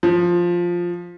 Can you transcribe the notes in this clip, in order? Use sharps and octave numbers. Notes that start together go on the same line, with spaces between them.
F3